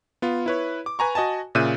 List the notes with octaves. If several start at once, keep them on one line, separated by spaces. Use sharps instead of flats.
B3 F4
E4 B4 C#5
D6
B4 G#5 A#5 C#6
F#4 D#5 G#5 A5
A#2 C#3 E5 F#6 G6 D#7